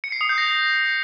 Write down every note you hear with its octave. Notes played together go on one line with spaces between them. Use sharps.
C#7
C7
D#6
G6
A#6